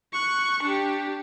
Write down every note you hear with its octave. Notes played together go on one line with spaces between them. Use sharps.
C#6 F#6
D4 G4